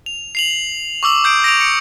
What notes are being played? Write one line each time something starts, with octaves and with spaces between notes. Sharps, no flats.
F7
C7 F7 F#7
C#6 D6 E6 F#7
D#6 G6 C7 D7
A#6 D7 F7
C#7 D7